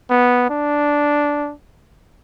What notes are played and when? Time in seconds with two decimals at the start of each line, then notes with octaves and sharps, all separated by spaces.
0.10 B3
0.50 D4